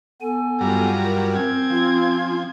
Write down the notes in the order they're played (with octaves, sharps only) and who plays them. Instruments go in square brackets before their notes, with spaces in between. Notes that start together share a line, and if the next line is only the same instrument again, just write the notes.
[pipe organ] B3 G#5 [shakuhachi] A4
[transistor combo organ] G2 F#3 G3 [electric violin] F4 A#5
[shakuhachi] A#4
[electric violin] C4 G#6 [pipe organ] C#4
[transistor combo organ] F3 [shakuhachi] F4